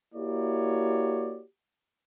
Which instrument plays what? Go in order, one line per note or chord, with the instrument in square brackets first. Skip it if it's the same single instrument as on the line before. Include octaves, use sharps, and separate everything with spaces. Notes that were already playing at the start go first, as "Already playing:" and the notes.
[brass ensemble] A#3 E4 F#4 G4 C#5 D5